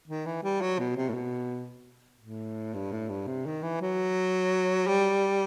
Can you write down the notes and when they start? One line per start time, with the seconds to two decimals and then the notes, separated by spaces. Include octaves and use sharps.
0.08 D#3
0.26 E3
0.43 G3
0.61 F#3
0.79 B2
0.96 C3
1.09 A2
1.14 B2
2.21 A2
2.74 G2
2.92 A2
3.09 G2
3.27 C3
3.46 D#3
3.62 E3
3.81 F#3
4.87 G3